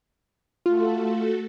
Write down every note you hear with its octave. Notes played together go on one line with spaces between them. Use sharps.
A3 F4 F#4 A4